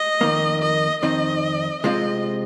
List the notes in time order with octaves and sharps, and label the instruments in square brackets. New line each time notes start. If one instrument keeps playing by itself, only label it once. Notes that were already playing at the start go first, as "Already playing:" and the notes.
Already playing: [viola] D#5
[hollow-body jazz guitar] F2 D#3 A#3
[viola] D#5
[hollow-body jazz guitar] F2 D#3 C4 D#4 [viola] D#5
[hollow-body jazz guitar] C3 G#3 C4 F4 [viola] D#5